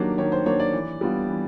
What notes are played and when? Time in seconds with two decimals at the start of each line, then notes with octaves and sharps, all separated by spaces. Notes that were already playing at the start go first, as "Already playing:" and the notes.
Already playing: D#3 F#3 A#3 D4 G4
0.18 D#3 C#5
0.32 C5
0.46 F#3 A#3 D4 C#5
0.59 D5
0.73 E3
1.01 G3 B3 D4 F4
1.28 E3